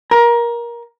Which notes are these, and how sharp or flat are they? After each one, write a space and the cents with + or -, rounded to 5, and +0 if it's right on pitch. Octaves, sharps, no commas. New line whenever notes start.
A#4 +20